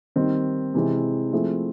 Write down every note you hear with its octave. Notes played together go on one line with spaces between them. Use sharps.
D#3 G3 C4
C3 E3 G#3 C4
F3 A3 C4 E4 G#4